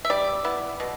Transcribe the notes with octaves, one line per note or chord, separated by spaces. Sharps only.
E5
G3 D5
B3 E4
B2